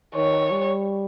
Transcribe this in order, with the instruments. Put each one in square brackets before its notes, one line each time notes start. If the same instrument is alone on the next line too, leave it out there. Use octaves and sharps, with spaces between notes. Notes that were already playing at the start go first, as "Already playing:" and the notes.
[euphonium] D#3 [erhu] C#5
[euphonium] G3